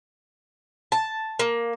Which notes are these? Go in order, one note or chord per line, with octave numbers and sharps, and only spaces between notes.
A5
A#3